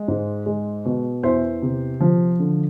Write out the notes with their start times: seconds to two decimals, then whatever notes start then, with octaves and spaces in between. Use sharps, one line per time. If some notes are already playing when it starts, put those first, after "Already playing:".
Already playing: G#3
0.08 G#2
0.46 G#3
0.85 B2
1.23 E2 C5 E5
1.62 C3
2.01 F3
2.40 D3